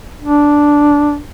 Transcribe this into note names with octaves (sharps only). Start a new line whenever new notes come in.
D4